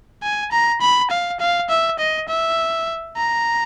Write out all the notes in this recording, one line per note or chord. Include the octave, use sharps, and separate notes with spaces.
G#5
A#5
B5
F5
F5
E5
D#5
E5
A#5